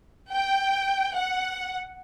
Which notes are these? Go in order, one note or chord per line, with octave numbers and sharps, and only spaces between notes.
G5
F#5